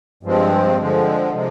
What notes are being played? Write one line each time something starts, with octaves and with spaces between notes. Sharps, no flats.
G2 F3 G#3 C4
D3 F3 G#3
C3 F3 G#3